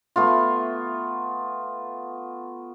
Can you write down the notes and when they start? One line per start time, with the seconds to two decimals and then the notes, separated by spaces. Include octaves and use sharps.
0.16 A3 B3 F4